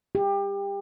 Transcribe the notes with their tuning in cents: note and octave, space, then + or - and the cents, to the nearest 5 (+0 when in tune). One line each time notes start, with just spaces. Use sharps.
G4 +25